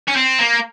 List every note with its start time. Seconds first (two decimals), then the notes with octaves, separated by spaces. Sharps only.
0.08 C#4
0.16 C4
0.39 A#3